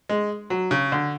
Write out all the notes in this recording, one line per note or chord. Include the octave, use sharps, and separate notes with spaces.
G#3
F#3
C#3
D3